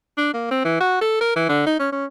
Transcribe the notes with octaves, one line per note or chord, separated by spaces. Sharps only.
D4
A#3
C4
E3
F#4
A4
A#4
E3
D3
D#4
C#4
C#4